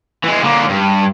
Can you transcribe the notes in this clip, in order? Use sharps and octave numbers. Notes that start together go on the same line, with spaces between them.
E3 G#3
D3 A#3
G2